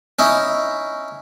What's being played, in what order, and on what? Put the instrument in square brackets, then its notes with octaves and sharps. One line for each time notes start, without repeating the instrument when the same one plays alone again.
[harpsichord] C#4 D#4 E4